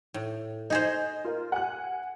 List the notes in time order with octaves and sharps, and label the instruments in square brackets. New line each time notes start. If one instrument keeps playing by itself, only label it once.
[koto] A2
[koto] D#4 G#4 C5 [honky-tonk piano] D#5
[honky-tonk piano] F4 A#4
F#5 G#5 F#6